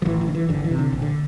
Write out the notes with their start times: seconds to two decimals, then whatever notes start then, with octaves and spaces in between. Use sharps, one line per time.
0.02 F3
0.05 A1 E3
0.21 E3
0.28 D3
0.35 E3
0.49 G1 D3
0.64 E3
0.71 C3
0.78 D3
0.92 A#1
1.02 D3